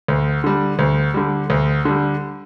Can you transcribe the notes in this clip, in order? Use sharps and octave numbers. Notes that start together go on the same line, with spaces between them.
D2
D3 G3
D2
D3 G3
D2
D3 G3